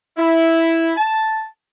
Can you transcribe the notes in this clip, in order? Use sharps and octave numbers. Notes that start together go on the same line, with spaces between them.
E4
A5